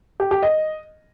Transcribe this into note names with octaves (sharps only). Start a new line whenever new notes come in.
G4
G4
D#5